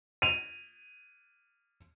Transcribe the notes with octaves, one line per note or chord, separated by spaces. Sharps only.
D#7 F7